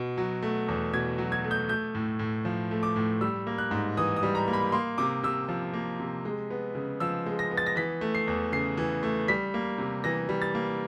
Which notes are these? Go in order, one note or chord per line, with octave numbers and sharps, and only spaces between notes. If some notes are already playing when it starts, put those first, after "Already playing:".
Already playing: B2
F#3
A3
E2
B2 G#6
F#3
G#6
A3
G6
A3 G6
A2
A2
F3
A3
D6
A2
G3 E6
A#3
F#6
G#2
E3 D#6
D#6
G3
A#5
A#3
B5
A#3 C6
C3 D6
C3 E6
F3
A#3
C3
G#3
B3
C#3
F3 E6
G#3
A#6
B3
A6
A#6
E3 B6
A3
C7
E2
C#3 C7
E3
A3
G3 B6
A#3
C3
E3 A#6
G3
A6
A#3